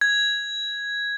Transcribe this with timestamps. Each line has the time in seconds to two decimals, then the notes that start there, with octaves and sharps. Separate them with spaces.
0.01 G#6